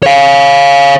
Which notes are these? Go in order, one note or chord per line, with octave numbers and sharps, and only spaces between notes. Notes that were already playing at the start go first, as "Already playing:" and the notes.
C#5 F5